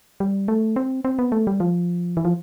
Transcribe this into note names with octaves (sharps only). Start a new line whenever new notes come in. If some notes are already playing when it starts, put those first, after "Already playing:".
G3
A3
C4
C4
B3
A3
G3
F3
E3
F3